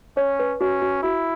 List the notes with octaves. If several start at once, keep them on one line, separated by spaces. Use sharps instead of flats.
C#4 C#5
B4
C#4 F#4
F#4
E4 F#4